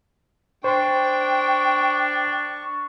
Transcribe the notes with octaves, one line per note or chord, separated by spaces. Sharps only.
D4 C5 G5 C6 C#6